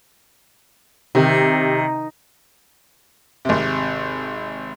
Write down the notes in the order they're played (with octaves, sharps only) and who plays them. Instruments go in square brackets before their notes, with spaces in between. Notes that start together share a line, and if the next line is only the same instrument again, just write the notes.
[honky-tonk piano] C3 [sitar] D#3
[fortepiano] G#1 C3